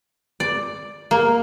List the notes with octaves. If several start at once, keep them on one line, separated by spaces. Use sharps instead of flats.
D5
A#3